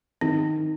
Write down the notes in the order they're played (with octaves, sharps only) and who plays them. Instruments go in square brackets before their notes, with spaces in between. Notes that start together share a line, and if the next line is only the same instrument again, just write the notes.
[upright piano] D#3 [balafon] C4